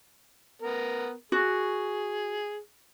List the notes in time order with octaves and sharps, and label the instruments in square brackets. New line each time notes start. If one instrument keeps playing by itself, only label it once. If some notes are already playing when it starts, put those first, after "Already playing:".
[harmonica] B3 A#4
[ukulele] F#4 [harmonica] G#4